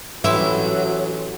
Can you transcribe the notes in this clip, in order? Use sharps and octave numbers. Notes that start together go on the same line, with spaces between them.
A1 F#3 E4 G4 C5